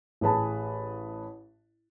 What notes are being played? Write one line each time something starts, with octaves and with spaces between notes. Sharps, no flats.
A1 G#4 B4 A5